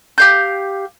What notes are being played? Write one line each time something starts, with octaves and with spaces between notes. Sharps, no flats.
G4 F5 G6